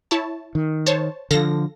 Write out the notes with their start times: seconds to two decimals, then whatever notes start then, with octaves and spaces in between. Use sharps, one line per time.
0.11 E4 C#5 A5
0.55 D#3
0.86 C5 C#5 A5
1.31 D3 F3 A4 F5 A#6